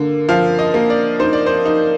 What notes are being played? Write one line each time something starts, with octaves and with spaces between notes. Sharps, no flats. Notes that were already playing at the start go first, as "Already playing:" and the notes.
Already playing: D3 A#3
F3 F5
D#5
A#3
D5
D#4 C5
D5
C5
D#4